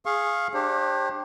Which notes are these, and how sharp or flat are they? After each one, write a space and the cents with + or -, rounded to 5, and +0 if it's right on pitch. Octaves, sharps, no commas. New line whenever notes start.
G#4 +0 F5 +0 C#6 -30
D4 +20 G4 +0 C5 +45